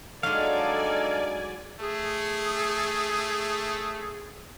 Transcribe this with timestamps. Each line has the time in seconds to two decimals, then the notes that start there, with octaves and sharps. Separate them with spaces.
0.23 F#3 G#3 D4 D#4 A4 D5 F5 G#5
1.81 A3 G#4